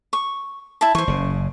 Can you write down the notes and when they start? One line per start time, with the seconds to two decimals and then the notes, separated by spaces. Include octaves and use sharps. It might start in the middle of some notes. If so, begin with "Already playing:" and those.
0.13 C#6
0.81 E4 E5 A5
0.95 E3 C5 C#6
1.07 F#1 C#3